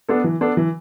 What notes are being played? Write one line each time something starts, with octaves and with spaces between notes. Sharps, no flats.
B3 D4 A4
E3
B3 D4 A4
E3